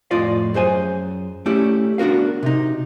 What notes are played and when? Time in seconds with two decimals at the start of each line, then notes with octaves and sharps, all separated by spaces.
0.11 F2 A2 F4 D5 D#5 F5
0.54 F#2 G#4 C5 G#5
1.46 A3 C#4 E4 G4 D5
1.98 B3 D4 F#4 A#4 F5
2.43 C3 D#4